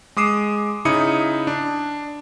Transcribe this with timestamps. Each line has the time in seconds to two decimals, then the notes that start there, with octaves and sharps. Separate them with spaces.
0.16 G#3 D6 D#6 C7 E7
0.85 C#3 D#4 E4 D#6 C#7
1.47 D4